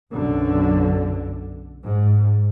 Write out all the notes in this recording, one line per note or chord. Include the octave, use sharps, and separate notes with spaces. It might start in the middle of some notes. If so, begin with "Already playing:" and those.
B1 F#2 D3
G#2